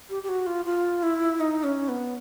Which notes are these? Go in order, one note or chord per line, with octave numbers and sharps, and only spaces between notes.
G4
G4
F#4
F4
F4
E4
D#4
C#4
B3